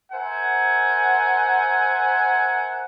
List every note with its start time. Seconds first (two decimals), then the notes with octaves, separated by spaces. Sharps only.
0.13 A#4 C5 E5 F#5 G#5